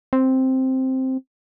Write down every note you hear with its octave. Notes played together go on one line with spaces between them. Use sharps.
C4